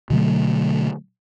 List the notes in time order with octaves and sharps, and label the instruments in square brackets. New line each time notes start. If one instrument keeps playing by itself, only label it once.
[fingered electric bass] B2 D3 F#3 A3